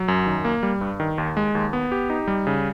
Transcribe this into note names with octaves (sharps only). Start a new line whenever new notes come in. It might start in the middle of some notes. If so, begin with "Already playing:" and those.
Already playing: F#3
F#2
D#3
A#3
G3
G2
D#3
D#2
G#3
D#2
B3
G4
D#4
G3
C#3